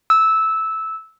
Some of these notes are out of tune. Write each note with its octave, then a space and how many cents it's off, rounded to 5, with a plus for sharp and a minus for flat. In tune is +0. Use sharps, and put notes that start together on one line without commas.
E6 -15